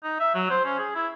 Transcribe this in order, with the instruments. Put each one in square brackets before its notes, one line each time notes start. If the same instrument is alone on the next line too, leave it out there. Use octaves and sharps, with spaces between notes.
[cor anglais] D#4
E5
F#3
C5
C#4
G#4
E4